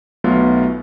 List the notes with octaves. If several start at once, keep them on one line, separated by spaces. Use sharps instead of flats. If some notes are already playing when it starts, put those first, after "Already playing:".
B1 F#3 A3 B3 F4